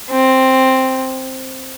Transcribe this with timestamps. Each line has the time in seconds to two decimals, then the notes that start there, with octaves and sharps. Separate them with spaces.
0.11 C4